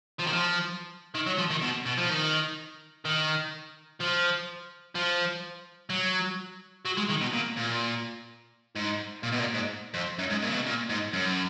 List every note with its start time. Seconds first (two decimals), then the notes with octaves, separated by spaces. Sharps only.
0.20 F3
0.27 D#3
0.33 F3
1.15 D#3
1.26 F#3
1.38 F3
1.50 D#3
1.62 B2
1.86 B2
1.98 F3
2.10 D#3
3.05 D#3
4.00 F3
4.95 F3
5.90 F#3
6.85 F#3
6.97 G#3
7.09 D#3
7.21 B2
7.33 A#2
7.57 A#2
8.75 G#2
9.23 A#2
9.32 B2
9.39 A#2
9.54 G#2
9.94 F2
10.18 F#2
10.30 G#2
10.42 A#2
10.48 C#3
10.54 B2
10.66 A#2
10.89 G#2
11.13 F#2